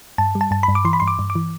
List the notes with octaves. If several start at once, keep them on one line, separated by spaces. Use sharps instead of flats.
G2 A5
G3
A5
G2 A5
B5
G2
D6
E3 C6
B5
G2 C6
D6
G2
D6
E3